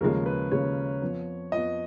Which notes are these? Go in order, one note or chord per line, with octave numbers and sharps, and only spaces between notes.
D#2 C#3 F3 G#3 C#4 A#4
B4
D#2 C#3 F3 G#3 C#4 C#5
F2 F3 B3
F2 F3 B3 D#5